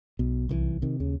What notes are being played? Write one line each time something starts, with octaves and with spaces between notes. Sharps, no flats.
B1 B2
C2 D#3 E3
C3 D#3
D#2 C#3